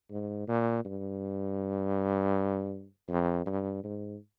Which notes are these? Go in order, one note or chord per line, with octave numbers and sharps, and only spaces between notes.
G#2
A#2
G2
F2
G2
G#2